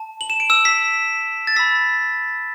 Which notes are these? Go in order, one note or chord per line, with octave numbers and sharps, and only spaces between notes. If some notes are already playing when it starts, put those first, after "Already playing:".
Already playing: A5
F#7
E7
D7
E6 E7
B6
A6
B5 E6 B6